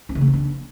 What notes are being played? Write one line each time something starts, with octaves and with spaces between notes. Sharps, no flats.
C#4
C#3
B3
C4
D4